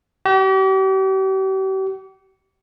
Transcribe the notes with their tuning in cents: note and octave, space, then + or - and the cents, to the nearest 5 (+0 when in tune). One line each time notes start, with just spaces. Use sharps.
G4 -40